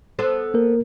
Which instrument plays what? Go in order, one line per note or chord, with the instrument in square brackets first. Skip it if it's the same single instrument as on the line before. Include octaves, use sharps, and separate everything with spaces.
[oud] B3 A4 C5
[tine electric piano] A#3 A#4